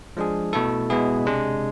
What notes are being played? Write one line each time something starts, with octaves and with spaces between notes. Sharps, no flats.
F3 G#3 D4 G#4
B2 A3 E4 A4
B2 G#3 B3 E4 G#4
C3 G#3 D4